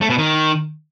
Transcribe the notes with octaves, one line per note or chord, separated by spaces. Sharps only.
A3
B2
D#3